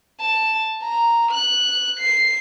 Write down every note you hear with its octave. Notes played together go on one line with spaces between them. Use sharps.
A5
A#5
F#6
C7